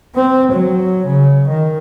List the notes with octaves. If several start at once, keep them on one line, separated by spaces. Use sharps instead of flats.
C4
F#3
C#3
D#3